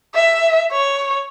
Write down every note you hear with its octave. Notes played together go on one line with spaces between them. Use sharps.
E5
C#5